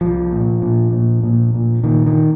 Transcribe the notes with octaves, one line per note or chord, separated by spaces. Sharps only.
C2 F3
A#2
A#2
A#2
A#2
A#2
A#2 D#3
D#3